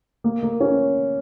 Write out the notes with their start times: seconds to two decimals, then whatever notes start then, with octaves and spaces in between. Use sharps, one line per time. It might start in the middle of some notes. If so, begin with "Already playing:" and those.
0.24 A#3
0.43 A#3
0.60 C#4